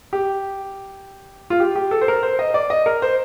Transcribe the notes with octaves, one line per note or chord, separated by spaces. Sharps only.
G4
F4
G4
G4
A4
C5
A#4
C5
D#5
D5
D#5
A#4
C5